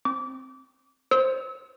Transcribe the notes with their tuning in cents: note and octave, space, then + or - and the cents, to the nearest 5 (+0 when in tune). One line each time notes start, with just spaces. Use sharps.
C4 +10 D6 -20
C5 +0 E6 -35